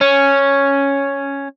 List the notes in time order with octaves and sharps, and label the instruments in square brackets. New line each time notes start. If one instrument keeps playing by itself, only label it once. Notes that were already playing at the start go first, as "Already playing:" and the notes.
[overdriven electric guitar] C#4